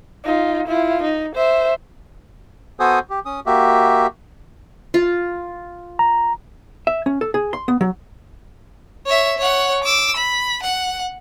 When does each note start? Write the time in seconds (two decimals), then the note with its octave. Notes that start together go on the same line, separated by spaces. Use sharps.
0.25 D#4 F4
0.68 E4 F4
1.03 D#4
1.35 C5 E5
2.80 B3 F#4 A4 C5 G#5 D#6
3.10 G4
3.25 C#4 D#6
3.46 A#3 F#4 G4 E5
4.94 F4
5.99 A#5
6.87 E5
7.06 C#4
7.21 A4
7.34 G#4
7.53 C6
7.68 B3
7.81 F#3
9.06 C#5 E5
9.38 C#5 F#5
9.83 D6 E6
10.16 B5
10.63 F#5